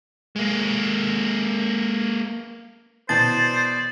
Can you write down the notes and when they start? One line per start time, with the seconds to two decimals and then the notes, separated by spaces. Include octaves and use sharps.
0.36 G#3 A#3
3.09 B2 E3 C5 D5 A5 A6